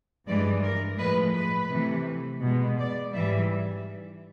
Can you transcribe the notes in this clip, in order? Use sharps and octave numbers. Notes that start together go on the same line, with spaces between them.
G2 E3 G#3 D5
A#4
A2 F3 G#3 B4
B4
C3 E3 A3
B2 G#3
D5
G#2 E3 G3 E5